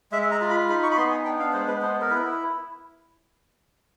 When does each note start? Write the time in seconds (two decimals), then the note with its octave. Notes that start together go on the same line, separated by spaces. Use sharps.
0.12 G#3 E5
0.31 A#5
0.41 F4
0.50 B5
0.69 D#4 B5
0.83 C#6
0.91 B5
0.97 B3 C6
1.11 G#5
1.25 D4 G5
1.40 F5
1.53 G#3 C5
1.68 B4
1.81 B3 C5
2.01 A#4
2.10 E4 B4